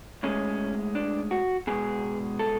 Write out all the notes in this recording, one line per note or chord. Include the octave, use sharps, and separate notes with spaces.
A2 G#3 C#4
D4
F#4
B2 G#3 G#4
A4